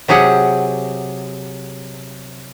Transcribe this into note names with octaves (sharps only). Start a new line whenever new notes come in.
C3 F#3 G4 G#4 F#5